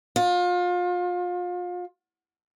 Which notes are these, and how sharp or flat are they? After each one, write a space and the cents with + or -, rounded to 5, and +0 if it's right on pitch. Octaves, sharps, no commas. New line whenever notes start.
F4 +30